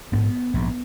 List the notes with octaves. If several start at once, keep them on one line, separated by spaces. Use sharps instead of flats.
A#1 G#2 B3
A#1 G#2